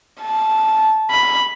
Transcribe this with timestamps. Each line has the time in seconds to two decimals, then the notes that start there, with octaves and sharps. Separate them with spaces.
0.21 A5
1.10 B5